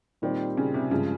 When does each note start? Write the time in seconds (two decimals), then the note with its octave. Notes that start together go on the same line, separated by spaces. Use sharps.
0.22 A#2 D#3 G3 C4 G4 C5
0.57 C#3
0.74 C3
0.91 G2 C#3 F3 G#3